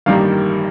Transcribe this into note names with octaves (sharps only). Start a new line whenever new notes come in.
A1 G2 D#3 G3 A#3 F5